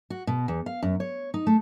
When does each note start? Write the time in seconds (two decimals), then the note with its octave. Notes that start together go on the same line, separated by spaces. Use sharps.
0.10 F#4
0.27 B2
0.48 E2
0.66 F5
0.83 F#2
1.00 C#5
1.34 D#4
1.47 A3